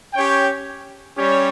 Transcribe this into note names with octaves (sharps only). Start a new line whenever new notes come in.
C#4 G4 C#5 G5
G3 C#4 G4 C#5